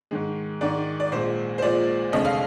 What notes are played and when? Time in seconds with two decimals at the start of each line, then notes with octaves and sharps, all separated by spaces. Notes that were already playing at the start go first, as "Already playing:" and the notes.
0.11 G#2 D#3 G#3
0.61 G#2 D#3 G#3 D5
1.00 D5
1.12 A#1 A#2 G#3 C5
1.58 C5
1.62 A#1 A#2 G#3 D5
2.12 F1 D#2 D3 G#3 D4 D#5
2.25 F5